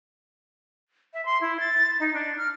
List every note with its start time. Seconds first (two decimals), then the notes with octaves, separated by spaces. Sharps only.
1.14 E5
1.25 C6
1.41 E4
1.60 A6
2.00 D#4
2.14 D4
2.38 F6